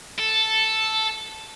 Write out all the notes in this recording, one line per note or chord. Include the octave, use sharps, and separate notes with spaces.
A4